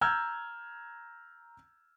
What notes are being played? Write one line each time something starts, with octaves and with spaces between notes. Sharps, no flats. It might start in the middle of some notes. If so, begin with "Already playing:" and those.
A#5 E6 F6 G6 G#6